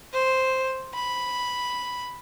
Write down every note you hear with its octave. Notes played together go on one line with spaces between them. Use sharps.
C5
B5